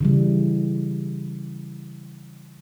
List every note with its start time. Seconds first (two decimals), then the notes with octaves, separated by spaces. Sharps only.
0.01 C#3 E3 G3